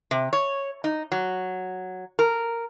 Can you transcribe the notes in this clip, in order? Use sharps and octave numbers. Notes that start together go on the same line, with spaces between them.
C3
C#5
D#4
F#3
A#4